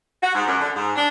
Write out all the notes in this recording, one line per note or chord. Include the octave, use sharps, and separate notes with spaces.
F#4
G#2
F#2
D3
G#2
D4